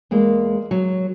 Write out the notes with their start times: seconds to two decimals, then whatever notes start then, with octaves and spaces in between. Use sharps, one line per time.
0.11 E2 G#3 A#3
0.71 F#3